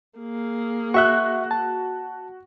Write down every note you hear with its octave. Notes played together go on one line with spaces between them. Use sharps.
A#3 G#4
F#4 E5 C#6 F#6
A5